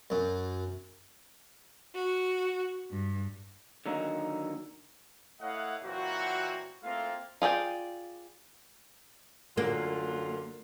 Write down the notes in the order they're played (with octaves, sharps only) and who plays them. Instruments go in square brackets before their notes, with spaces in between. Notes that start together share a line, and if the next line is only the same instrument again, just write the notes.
[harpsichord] F#2
[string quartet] F#4
G2
[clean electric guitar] D3 D#3 F#3 A#3 D#4
[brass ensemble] A3 E4 C#5 D#5 F5 F#5
A#2 E3 F#3 A#3 C4 F#4
A3 A#3 C4 E4 F4 F5
[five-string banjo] F4 G#4 D5 G5
[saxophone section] F#2 D3 F4 [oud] A#3